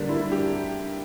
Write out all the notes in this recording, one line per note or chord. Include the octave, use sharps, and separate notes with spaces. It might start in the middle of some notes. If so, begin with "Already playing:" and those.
Already playing: D3 G3 A#3 D4
E4
G4